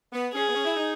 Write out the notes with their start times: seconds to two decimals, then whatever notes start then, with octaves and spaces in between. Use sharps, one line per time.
0.12 B3
0.33 C#4 G#4
0.48 B3
0.54 C#4
0.65 E4
0.75 D#4